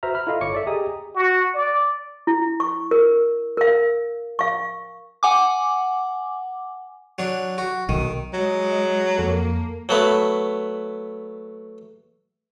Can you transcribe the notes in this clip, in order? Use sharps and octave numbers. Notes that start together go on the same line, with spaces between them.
F#4 B4 C5 E5 A#5 F6
B5 F6
E4 F4 A4 D#5 F5
G1 C#5 C#6 D6 C#7
A4 D5 E5
G4 G#4 D#5 G#5 A#5 D#6
F#4
D5
E4
C#6
A#4
A#4 F5
F5 C#6
F#5 G#5 D6
F#3 D4
F#4
B1 D#3
F#3 G#3
D#5
F2 A#3 A4
F#3 A3 B3